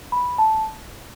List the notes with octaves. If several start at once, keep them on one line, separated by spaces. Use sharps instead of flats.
B5
A5